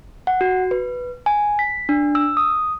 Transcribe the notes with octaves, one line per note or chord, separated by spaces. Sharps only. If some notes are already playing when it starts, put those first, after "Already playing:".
F#5
F#4
B4
G#5
B6
D4
E6
D#6